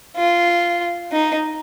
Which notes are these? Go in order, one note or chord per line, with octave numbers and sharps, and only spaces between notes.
F4
D#4